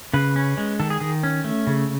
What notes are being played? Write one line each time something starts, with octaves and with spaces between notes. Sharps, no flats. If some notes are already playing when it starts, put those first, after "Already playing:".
C#3 B4
C#4
G#3
D#3 A4
G#4
D#3 G#4
C#4
A3
C#3